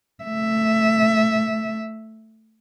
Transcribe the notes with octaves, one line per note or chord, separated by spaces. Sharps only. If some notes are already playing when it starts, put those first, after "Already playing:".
A3 E5